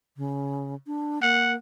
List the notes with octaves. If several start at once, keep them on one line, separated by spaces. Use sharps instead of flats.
C#3
D4
A#3 F#5